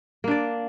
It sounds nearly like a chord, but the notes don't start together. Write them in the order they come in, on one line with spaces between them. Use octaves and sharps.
A#3 D4 D5